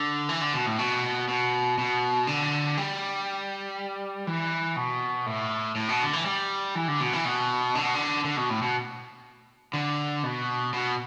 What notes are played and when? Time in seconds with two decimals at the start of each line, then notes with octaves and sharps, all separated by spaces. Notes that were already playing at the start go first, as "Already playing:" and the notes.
Already playing: D3
0.29 E3
0.41 D3
0.54 B2
0.66 A2
0.79 B2
1.28 B2
1.78 B2
2.27 D3
2.78 G3
4.27 E3
4.76 B2
5.26 A2
5.76 A2
5.89 B2
6.01 D3
6.13 E3
6.26 G3
6.75 E3
6.88 D3
7.00 B2
7.13 E3
7.25 B2
7.75 D3
7.85 B2
7.95 D3
8.25 D3
8.37 B2
8.50 A2
8.62 B2
9.73 D3
10.23 B2
10.74 B2